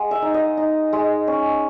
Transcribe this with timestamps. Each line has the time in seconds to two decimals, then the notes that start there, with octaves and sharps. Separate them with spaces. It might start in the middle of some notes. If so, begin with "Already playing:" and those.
Already playing: G#3 F#5
0.11 E5
0.22 D#4
0.34 D#5
0.57 D#4
0.93 G#3
1.27 C#4